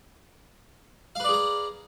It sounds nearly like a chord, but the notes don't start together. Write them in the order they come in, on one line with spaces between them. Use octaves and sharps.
F5 B4 D5 G#4 A#5